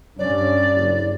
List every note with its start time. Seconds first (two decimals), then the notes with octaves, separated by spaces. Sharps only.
0.19 G2 C#4 C#5 D5
0.75 F#1